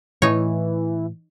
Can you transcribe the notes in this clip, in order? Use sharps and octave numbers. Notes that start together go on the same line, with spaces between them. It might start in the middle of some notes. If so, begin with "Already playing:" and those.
A2 E3 D#4 C#5